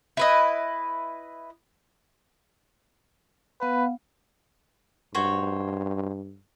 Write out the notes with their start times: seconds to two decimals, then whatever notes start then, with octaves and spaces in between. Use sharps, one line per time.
0.17 E4 B4 D#5
3.61 B3 B4 F5 F#5
5.15 G2 F#4 C5 C#5